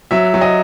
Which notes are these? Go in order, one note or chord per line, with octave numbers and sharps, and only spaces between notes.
F#3 E5
F#3
D#5